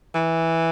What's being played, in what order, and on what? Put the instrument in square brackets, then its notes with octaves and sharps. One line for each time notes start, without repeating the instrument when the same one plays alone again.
[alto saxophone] E3